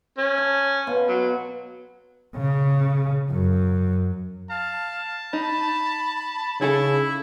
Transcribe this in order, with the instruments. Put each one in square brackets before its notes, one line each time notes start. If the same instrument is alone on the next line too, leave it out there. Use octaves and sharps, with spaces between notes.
[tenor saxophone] C#4
[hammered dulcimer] A5
B2 F4
[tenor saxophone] F#3
[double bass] C#3
F#2
[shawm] F5 [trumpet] A5
[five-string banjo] D#4 [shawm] B5
[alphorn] C#3 [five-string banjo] D#4 G#4 A4 [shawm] E4